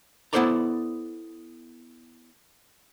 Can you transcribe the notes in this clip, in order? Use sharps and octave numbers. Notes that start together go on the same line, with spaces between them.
B3 E4 A4 C5 D5 A#5